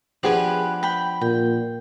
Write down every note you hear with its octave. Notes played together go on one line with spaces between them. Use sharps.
F3 B3 D4 G4 G#4 B4
G5 B5
A#2 G5